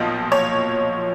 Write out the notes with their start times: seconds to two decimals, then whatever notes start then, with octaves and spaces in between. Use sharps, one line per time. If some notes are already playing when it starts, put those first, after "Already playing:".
Already playing: B1 A#2 F3 D#5
0.32 C#5